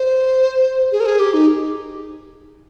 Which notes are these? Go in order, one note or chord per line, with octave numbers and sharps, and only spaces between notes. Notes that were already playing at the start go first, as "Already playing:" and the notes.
Already playing: C5
G#4
A#4
G#4
G4
D#4